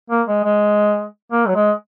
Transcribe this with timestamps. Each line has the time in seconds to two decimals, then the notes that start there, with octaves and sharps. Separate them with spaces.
0.10 A#3
0.27 G#3
0.44 G#3
1.32 A#3
1.47 F#3
1.55 G#3